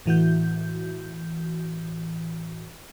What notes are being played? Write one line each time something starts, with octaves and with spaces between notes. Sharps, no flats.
A2 E3 F#4 G6